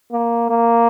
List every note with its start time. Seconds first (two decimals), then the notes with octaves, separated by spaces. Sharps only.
0.12 A#3
0.50 A#3